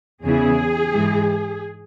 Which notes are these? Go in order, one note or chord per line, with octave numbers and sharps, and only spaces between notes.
E2 C#3 E3 B3 E4 G#4
G#2 E3 G#3